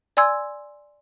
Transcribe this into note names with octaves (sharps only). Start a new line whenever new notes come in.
D5 G#5 C6 E6 G#6